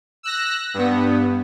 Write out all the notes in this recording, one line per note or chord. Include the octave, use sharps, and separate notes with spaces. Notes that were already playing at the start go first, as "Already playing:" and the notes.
E6 F#6 A#6
G2 B3